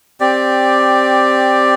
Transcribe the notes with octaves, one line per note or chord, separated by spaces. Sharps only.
C4 G4 D5